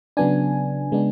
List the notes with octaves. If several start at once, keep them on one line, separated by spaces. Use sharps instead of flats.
C#3 F#3 B3 D4 G#5
C#3 G#3 B3 D4